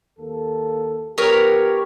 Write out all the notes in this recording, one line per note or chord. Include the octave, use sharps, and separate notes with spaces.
D#2 A#3 A4
F3 B3 G4 A#4 B4 C#5